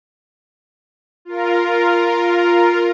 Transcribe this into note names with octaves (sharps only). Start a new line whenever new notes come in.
F4 A#4